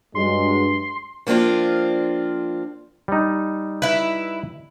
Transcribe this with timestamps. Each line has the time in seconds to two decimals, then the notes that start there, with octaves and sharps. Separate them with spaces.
0.15 G2 F#3 G#3 C6
1.27 F3 A#3 C4 D4 F4
3.08 G3 D#4
3.82 E4 B4